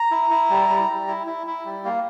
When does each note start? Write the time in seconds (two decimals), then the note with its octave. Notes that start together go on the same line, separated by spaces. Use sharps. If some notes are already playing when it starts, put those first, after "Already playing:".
Already playing: A#5
0.11 E4
0.31 E4
0.50 G3
0.69 G3
0.88 G3
1.08 E4
1.27 E4
1.47 E4
1.65 G3
1.85 A#3